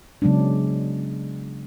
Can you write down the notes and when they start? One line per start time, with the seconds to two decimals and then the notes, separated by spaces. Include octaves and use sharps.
0.22 C#3 F#3 G#3 B3 D4